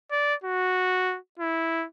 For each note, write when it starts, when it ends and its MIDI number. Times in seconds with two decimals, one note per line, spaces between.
0.11 0.34 74
0.44 1.18 66
1.39 1.86 64